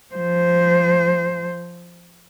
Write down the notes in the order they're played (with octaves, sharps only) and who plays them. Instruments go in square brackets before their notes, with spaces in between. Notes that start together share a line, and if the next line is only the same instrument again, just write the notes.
[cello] F3 C5